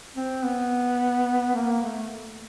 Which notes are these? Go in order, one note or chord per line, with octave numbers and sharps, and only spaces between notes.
C4
B3
A#3
A3